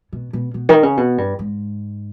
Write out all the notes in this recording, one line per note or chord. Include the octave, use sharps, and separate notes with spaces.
B2
B2
B2
D#3
C#3
B2
G2
G#2